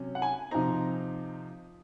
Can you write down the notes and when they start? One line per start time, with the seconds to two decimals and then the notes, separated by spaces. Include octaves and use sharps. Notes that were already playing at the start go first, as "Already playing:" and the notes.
Already playing: C3 F#3 C#4
0.15 F#5
0.22 G#5
0.51 C3 F3 C4 D#4 A#5